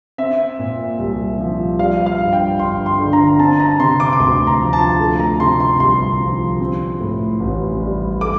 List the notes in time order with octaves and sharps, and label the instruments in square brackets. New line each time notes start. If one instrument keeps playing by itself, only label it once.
[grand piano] C4 E5
A#2
C2
F3
G3 F5
F5
G2
G5
G1 C6
C6
D3
A#5
C4 A5
A#5
C3 C6
D6
D6
D2 C6
A#5
F3
A5
A3
A#5
C3 C6
C6
C2 C6
F3
C4
A2
A1
G3
A3 D6